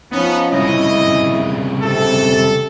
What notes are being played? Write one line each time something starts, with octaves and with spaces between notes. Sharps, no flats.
F3 B3 C#4 D#4
C2 C#3 E4 D#5
C3 A4